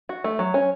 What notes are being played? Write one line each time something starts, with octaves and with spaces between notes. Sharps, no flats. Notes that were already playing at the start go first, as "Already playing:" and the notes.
F#4
A3
F#3
C#4